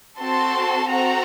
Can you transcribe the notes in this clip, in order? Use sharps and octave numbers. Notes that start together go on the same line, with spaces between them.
C4 F#4 A4 A5 C6
C4 F#4 A4 F#5 A#5